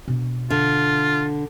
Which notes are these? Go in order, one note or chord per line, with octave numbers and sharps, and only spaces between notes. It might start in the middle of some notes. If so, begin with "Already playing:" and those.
B2 D4
D3 F4